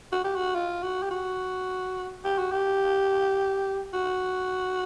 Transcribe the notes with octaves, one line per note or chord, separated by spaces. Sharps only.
F#4
G4
F#4
F4
F#4
G4
F#4
G4
F#4
G4
F#4